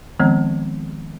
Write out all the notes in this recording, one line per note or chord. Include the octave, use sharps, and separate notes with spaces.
D#3 F3 G#3 B3 C4